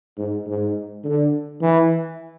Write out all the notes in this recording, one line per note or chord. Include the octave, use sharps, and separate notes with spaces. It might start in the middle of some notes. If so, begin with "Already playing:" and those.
G#2
G#2
D3
E3